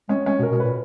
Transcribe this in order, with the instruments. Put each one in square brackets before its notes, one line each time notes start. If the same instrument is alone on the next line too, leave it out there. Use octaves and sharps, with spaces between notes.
[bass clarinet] G#3 [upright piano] C#4
[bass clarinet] G#3 [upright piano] C#4
[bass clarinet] B2
[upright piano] A#4
[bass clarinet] B2
[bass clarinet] A#2 [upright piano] B4